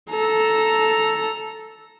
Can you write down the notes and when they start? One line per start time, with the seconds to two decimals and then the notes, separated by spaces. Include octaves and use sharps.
0.10 A4 A#5